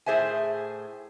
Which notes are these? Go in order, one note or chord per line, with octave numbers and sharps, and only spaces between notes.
A2 G#4 C5 E5 G#5